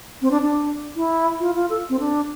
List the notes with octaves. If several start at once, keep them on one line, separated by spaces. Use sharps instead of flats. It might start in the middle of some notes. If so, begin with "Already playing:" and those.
C4
D4
D4
E4
F4
F4
A4
C4
D4